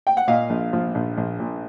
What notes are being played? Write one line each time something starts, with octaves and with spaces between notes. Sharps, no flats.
G5
F#5
A#2 D#5 F5
A#1
F3
A#1
A#1
A#2